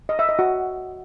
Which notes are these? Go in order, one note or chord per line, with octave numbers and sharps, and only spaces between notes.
D#5
E5
D#5
F#4